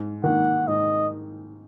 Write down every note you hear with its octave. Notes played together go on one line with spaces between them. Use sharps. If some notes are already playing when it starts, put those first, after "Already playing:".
Already playing: G#2
D#3 A#3 F#5
G#2 D#5